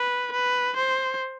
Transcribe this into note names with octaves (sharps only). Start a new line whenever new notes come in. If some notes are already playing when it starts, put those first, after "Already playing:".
Already playing: B4
B4
C5